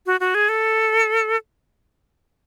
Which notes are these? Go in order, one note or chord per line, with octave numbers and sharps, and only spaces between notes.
F#4
F#4
G#4
A4